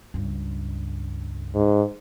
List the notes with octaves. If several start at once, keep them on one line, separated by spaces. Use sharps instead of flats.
C#2 G2
G#2